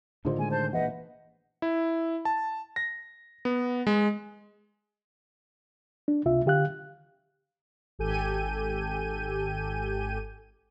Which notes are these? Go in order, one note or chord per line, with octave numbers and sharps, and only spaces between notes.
A2 D3 D#3 D#4 F4 C5
G#3 G#5
C5 A5 G6
A#1 E3 B4 D#5 F#5
E4
A5
A#6
B3
G#3
D4
C#2 C3 F4 E5
D3 G4 F5 F#6
G#1 G4 A4 G#5 G6 D#7